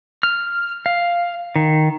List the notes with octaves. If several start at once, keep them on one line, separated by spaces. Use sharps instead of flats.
F6
F5
D#3